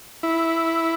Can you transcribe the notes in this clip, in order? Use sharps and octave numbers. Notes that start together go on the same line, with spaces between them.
E4